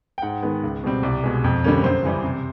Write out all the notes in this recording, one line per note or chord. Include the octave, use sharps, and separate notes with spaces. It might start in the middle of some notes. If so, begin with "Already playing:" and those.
G5
G#2 F#5
D#3 G#3 B3
C#2
B2 G3 C4
C2 D5
B2 G#3
F2
D3 G3 A#3 C#4
F#2 C5
C#3 E3 G3
C3